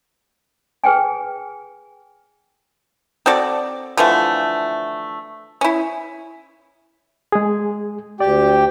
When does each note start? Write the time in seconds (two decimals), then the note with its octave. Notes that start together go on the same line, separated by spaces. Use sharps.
0.84 G#4 B4 G5 G#5
3.26 C4 F#4 A4 D5
3.97 D3 E3 F3 A3
5.61 C#4 E4
7.32 G#3 G#4
8.20 D2 G4 D5 G5